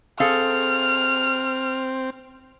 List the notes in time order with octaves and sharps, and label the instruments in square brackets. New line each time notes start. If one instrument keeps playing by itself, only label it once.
[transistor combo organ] C4 [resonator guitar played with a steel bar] G#4 A4 F5 [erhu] F6